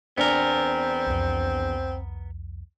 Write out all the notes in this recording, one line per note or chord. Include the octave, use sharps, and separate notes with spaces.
E2 B3 C4 D4 A#4
C2 F2